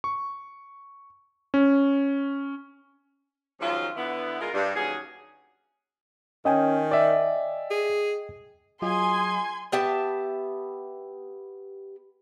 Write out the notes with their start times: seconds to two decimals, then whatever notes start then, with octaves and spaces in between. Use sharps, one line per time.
0.04 C#6
1.54 C#4
3.60 D#3 F3 F#3 G#3 C#4 F4
3.96 D3 B3 E4
4.40 G#3 F4 A#4
4.53 G2
4.75 D#2 F#3 C#4 G#4
6.45 D#3 C#4 D#5 G5 G#5 D#6
6.91 D5 E5
7.71 G#4
8.82 F#3 F4 G#4 D#5 G#5 C6 G#6
9.72 B3 G4 E5 A5